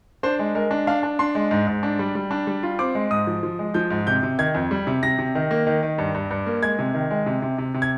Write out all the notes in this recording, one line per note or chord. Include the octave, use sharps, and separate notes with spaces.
D4 C5
G#3
G#3 A#4
D4
D4 F5
D4
D4 C6
G#3
G#2
G#2
D4
G3
G3
D4
G3
F4
C4 D6
G#3
G#2 D#6
F3
F3
G#3
F3 G6
G#2
C3 G6
C3
D#3 G#6
F2
G3
C3
C3 A#6
C3
D#3
A#3
D#3
D#3
G2
G2
G2
A#3
G#3 G#6
C3
D#3
G#3
C3
C3
C3
C3
G#6